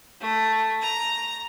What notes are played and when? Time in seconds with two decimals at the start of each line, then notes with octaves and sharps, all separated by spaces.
0.21 A3
0.82 A#5